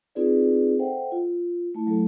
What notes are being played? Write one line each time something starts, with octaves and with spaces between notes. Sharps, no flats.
C4 D#4 F4 G#4 B4 D5
A4 C5 E5 F#5 G5
F4
A3 E4 A5
F#3 A3 A4